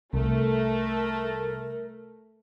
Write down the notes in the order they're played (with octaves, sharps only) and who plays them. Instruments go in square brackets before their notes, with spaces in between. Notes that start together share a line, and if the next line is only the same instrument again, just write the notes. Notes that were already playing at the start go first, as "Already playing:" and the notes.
[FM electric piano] C2 [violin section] A3 [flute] A#4